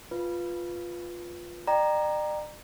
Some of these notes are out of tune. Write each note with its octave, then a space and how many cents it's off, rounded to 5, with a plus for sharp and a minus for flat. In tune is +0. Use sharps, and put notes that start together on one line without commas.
F4 +0 B4 +0
D5 +45 G5 +0 A#5 +0